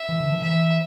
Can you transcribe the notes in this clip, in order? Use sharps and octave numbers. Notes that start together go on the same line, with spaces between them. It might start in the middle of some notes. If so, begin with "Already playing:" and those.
Already playing: E5
E3
D3
F3
E3 E5